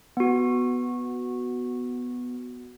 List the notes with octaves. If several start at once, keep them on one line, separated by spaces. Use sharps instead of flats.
B3 F#4